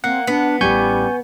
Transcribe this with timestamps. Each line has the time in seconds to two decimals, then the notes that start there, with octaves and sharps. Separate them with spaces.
0.04 A#3 C4 F#5
0.27 B3 D4
0.61 A1 G3 C#4 G#5 C#6 G6